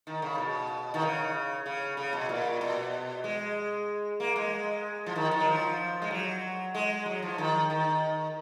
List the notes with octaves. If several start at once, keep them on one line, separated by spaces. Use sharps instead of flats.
D#3
C#3
B2
D#3
C#3
C#3
C#3
B2
A#2
B2
G#3
A#3
G#3
F3
D#3
D#3
F#3
F3
G#3
F#3
G#3
F#3
F3
D#3
D#3